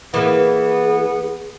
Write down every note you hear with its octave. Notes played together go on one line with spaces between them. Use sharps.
E3 A#3 B3 G#4